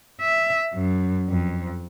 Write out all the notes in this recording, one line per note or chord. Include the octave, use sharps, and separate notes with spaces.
E5
F#2
F2